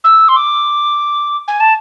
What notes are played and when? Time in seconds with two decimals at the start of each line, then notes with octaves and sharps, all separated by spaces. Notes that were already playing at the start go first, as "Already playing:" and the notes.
0.04 E6
0.29 C6
0.36 D6
1.48 G#5
1.60 A5